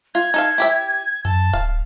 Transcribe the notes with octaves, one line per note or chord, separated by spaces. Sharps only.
F4 G#6
D#4 A4 F5
E4 G4 E5
F#2 A4 A5
D1 F5